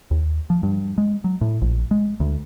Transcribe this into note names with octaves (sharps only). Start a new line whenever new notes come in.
D#2
F3
G2
G#3
F#3
A2
A#1
G#3
D2